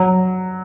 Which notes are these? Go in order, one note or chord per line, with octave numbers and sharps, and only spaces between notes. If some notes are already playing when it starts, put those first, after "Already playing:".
Already playing: F#3